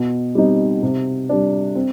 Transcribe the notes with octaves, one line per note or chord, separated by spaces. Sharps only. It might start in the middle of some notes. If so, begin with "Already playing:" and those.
Already playing: B2
G3 C4 D#4
C3
G3 D4
C4